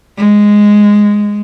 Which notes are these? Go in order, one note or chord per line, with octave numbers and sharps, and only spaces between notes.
G#3